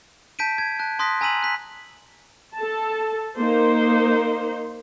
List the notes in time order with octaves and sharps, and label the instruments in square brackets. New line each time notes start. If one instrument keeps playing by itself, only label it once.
[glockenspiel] A5 G6 B6 D7 D#7
G#6
A5 F#6
A5 C6 D#6 F#6 A#6 B6
G#5 A#5 E6 B6 D#7 F#7
F#6 B6
[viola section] A4 A5
A#3 D#4 C5